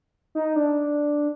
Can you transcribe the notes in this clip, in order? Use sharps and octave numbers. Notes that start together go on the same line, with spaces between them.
D#4
D4